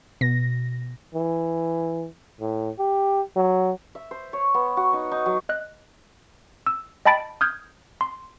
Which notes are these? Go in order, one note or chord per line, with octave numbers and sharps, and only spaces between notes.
B2 A#6
E3
A2
G4
F#3
E5
C5
C#5
B3
F#4
D#4
D#4
F#3
D#5 F#6
E6
D#5 G5 A5 B5 A6 D7
D#6 F6 G6 G#6
C6